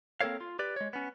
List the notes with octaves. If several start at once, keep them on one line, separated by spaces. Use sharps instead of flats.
A#3 C4 A4 A#4 C#5 F5
F4
G4 B4 D5
G#3 C#5
B3 C#4